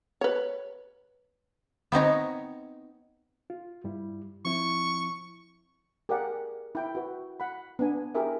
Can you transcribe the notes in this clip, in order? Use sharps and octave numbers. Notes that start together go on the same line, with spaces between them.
B4 C#5
B3 C4 D#4 C#5
F4
G2 G3 E4
F3 C4 E4 C#6
G4 G#4 A#4 D5 F5 F#5
E4 G5
F#4 B4
F#5 B5
B3 D4 G#5
E4 G4 G#4 A#4 E5